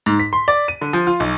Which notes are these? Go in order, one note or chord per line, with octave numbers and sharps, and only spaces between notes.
G#2
B6
C6
D5
D#7
D3
F3
F4
B1